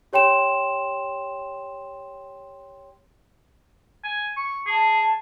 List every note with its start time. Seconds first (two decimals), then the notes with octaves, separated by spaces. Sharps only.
0.13 G4 C#5 G5 C6 E7
4.04 G#5
4.37 C#6
4.66 G#4 A5